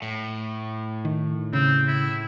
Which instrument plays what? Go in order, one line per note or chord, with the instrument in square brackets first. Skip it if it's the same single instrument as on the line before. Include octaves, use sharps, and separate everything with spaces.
[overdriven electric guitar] A2
[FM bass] D#3
[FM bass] C#3 [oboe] C4
[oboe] E4